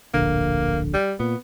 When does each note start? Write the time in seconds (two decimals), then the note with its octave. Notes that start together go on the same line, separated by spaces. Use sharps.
0.14 D1 A#1 D3 A#3
0.94 G3
1.20 A#2 B3